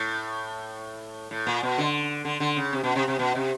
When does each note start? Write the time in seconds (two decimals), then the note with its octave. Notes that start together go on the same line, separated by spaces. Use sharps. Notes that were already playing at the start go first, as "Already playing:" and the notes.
Already playing: A2
1.31 A2
1.47 A#2
1.63 B2
1.78 D3
2.25 D3
2.40 D3
2.56 C#3
2.73 C3
2.83 B2
2.96 C3
3.08 C3
3.19 B2
3.35 C3